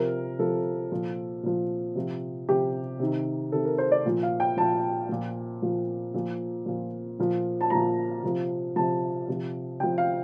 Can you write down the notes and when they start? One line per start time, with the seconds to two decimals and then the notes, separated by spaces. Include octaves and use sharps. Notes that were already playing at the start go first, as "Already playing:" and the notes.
Already playing: C3 F3 A#4
0.39 C3 F3 A4
0.92 A#2 F3
1.43 A#2 F3
1.95 C3 F3
2.49 C3 F3 G4
3.00 C3 D#3
3.52 C3 D#3 A4
3.65 A#4
3.78 C5
3.92 D5
4.05 A#2 F3
4.23 F5
4.40 G5
4.57 A#2 F3 A5
5.09 A#2 F3
5.62 A#2 F3
6.14 A#2 F3
6.66 A#2 F3
7.19 A#2 F3
7.61 A5
7.70 A#2 F3 A#5
8.23 C3 F3
8.76 C3 F3 A5
9.28 C3 F3
9.80 C3 G5
9.83 F3
9.98 F5